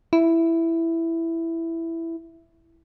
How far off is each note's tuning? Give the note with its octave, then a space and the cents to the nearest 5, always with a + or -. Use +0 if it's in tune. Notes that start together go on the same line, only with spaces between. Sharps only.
E4 +5